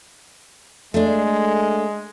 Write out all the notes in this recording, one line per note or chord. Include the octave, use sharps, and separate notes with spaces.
G#3 A3 D4